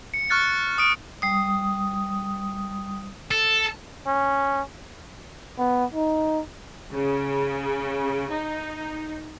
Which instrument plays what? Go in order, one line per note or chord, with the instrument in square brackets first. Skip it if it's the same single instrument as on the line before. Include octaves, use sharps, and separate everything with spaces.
[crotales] C#7
C#6 F6 F#6 A6 C#7
D#6 D7
[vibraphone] G3 D#6
[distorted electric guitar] A4
[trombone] C#4
[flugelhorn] B3
D#4
[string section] C#3
D#4